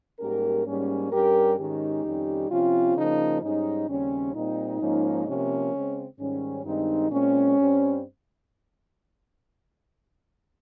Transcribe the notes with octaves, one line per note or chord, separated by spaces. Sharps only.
G#2 G3 A#3 C#4 G4 A#4
G#2 G3 A#3 C#4
G2 G3 C#4 G4 A#4
G#2 D#3 G#3 C#4 D#4 G4
F2 D#3 G3 C#4
C3 F3 C4 C#4 F4
C#3 F3 A#3 D#4
G#2 G3 C#4 D#4
D#2 C#3 G3 C4 C#4
A#2 G3 C4 D#4
G#2 F3 A#3 C#4
C3 F3 A#3 C#4
C#3 G#3 C4
G#2 D#3 G3 C#4
G2 D#3 G#3 C4 D#4
A#2 G#3 C4 C#4
G2 G3 C4